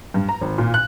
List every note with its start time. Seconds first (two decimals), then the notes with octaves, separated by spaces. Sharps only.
0.14 G2
0.29 A#5
0.41 G#1
0.58 A#2
0.74 F#6